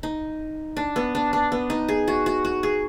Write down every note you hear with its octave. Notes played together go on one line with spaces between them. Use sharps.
D#4
D4
B3
D4
D4
B3
D#4
G#4
F#4
F#4
F#4
G#4